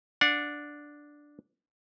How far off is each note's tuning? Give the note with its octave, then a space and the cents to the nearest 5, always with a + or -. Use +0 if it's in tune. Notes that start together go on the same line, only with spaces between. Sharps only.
D4 +0 F#5 -35